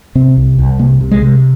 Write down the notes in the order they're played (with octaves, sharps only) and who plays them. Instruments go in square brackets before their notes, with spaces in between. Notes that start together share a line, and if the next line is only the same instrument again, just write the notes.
[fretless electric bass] C3 C4
C2
C2
C3 A#3
C3
G#3
C3